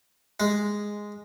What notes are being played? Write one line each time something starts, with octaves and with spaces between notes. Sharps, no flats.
G#3